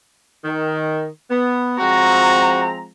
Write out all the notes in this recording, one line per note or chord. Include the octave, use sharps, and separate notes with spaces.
D#3
B3
F3 G#3 C4 F#4 A#5